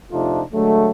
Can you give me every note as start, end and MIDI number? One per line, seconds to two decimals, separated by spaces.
0.12 0.42 41
0.12 0.42 48
0.12 0.42 57
0.12 0.42 62
0.12 0.42 63
0.12 0.42 65
0.53 0.91 50
0.53 0.91 54
0.53 0.91 56
0.53 0.91 57